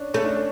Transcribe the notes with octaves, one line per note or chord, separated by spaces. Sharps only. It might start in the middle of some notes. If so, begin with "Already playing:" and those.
Already playing: C#4 D4
A3 C#4
D4
C#4